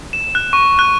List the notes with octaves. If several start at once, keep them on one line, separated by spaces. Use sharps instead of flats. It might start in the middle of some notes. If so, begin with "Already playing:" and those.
E7
F#6
C#6
F#6